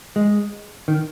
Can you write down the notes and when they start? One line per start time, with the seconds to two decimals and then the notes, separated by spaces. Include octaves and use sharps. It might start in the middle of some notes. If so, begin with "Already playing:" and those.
0.16 G#3
0.88 D#3